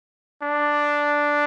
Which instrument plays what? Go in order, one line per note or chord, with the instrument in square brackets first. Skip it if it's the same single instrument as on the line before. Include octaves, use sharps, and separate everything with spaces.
[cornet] D4